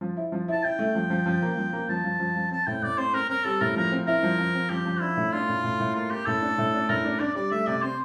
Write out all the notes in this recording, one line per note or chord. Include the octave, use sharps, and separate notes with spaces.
F3
E4
F3
E4 A5
E4 G5
A3
F3
F3
F3
A#3
F3
A#3
F3 A5
F3
F3
F3
C4 A5
A2 G5
A2 D5
C4 C5
C4 A#4
C4 A#4
G3 A4
A2 A#4
F3 A#4
C4
E4 A#4
F3
F3
C4
F3 G4
F3
D4 E4
A2
D4 F4
A2
A2
A2
A#3 F4
A#3 G4
A2 A4
D4
A2
D4
A2 A#4
D4
D4 D5
G3 D5
A3 E5
C3 D5
C4 C5